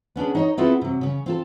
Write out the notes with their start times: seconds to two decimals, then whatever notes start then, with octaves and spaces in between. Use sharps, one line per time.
0.16 B3 C#4 D4 G#4
0.35 D#4 C#5 D#5
0.57 B3 C4 E4 F4 G#4 A4
0.81 C3 F#3
1.01 C#3 C#4
1.26 C4 F4 A4